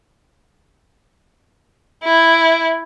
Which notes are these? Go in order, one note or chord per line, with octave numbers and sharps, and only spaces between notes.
E4